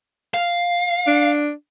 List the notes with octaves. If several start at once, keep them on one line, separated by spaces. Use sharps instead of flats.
F5
D4